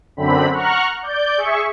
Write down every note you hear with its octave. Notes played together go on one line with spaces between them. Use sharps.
F#2 D3 C4 B5
F#5 A#5 C#6 F6 F#6
D5 G6
G#4 E5 C#6